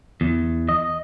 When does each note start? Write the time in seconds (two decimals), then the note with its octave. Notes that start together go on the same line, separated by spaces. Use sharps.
0.21 E2
0.69 D#5